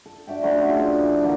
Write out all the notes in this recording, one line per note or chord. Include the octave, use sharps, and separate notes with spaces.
A4
D4 F#4 E5 G5
F#3 A3 C#4 C6
D4 F4 G#4 A4
E3
D3 A3 A#3 A#4